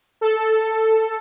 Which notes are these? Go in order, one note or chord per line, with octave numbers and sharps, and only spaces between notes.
A4